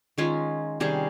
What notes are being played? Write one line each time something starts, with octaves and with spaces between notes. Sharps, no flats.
D#3 G#3 C#4 F4
C3 D#3 G3 C#4 G#4